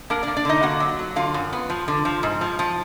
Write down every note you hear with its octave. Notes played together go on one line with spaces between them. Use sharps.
A#3 D4 A#4
A#3 D4 D5
D4 D5
D3 D#4 D#5
A#3 F#4 F#5
F#3
F#3
D3 F4 F5
F#2
B3
F3
D3
F3
G#2
F3
F3